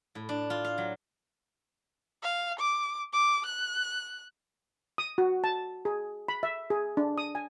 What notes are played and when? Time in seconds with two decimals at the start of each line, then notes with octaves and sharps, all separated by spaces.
0.15 A2
0.29 D4
0.50 F4
0.65 F5
0.78 F#3
2.23 F5
2.59 D6
3.13 D6
3.46 F#6
4.98 D#6
5.18 F#4
5.44 A5
5.85 G#4
6.28 B5
6.43 E5
6.70 G#4
6.97 D4
7.18 D#6
7.35 G#5